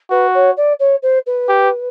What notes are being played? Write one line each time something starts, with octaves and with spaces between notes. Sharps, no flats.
F#4 B4
C#5
D5
C#5
C5
B4
G4